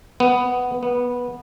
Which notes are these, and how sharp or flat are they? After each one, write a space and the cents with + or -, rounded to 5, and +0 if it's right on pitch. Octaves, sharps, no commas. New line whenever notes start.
B3 +5
B3 -15